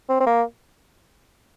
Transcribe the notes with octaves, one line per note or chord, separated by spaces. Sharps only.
C4
C4
A#3